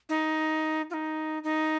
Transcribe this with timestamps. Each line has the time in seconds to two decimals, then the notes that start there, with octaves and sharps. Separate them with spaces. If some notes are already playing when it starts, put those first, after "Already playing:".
0.09 D#4
0.90 F4
0.94 D#4
1.44 D#4